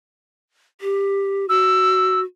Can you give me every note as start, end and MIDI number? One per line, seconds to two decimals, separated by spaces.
0.81 1.46 67
1.49 2.24 66
1.49 2.19 88